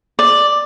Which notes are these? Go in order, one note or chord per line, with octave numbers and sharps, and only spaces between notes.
D5